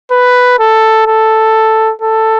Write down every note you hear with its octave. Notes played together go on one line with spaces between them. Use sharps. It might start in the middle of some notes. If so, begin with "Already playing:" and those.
B4
A4
A4
A4